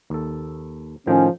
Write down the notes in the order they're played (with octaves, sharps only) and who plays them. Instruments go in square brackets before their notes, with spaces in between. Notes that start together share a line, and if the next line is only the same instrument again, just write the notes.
[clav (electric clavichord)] D#2 A4
[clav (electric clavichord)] A2 D#3 G5 [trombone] F3 [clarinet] C#4